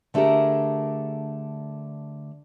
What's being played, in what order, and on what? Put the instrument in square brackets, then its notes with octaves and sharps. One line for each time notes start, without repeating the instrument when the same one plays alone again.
[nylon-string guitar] D3 A3 D4 G4 G#4 A#4